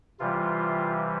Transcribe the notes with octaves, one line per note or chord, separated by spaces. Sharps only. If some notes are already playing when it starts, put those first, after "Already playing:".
C3 E3 G3 F4